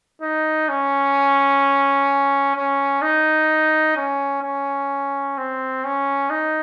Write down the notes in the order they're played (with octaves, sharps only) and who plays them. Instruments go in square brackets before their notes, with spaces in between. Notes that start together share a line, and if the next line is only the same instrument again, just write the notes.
[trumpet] D#4
C#4
C#4
D#4
C#4
C#4
C4
C#4
D#4